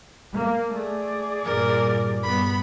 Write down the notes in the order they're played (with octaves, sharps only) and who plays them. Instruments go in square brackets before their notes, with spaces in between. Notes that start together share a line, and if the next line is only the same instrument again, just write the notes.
[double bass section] A#3
[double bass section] A3 [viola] G#4 D5
[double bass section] G2 A#2 [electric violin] A#4
[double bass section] G2 [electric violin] B3 B5